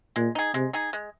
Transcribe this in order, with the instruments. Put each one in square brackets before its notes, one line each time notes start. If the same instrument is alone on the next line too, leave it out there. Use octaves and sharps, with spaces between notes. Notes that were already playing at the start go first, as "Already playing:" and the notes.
[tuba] A#2 [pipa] G#3
[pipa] D#4 G#4
[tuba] C3 [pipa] G#3
[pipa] D#4 G#4
G#3